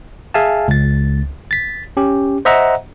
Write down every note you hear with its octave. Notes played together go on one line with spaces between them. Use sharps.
G#4 E5 F5 G#5 A5
C#2 A6
A6 B6
C#4 G4
C5 D#5 E5 F#5 A#5